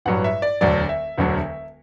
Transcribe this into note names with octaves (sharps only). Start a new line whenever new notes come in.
A1 G2 F#3 F#5
E5
D5
E1 D2 D3 F#3 D5
E5
E1 D2 D3 F#3